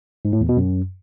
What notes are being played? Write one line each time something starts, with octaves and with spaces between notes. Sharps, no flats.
G#2
A2
E2
B2
F#2